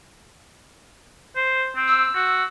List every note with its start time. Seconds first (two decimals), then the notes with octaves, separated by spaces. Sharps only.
1.36 C5
1.76 C4
1.88 E6
2.15 F#4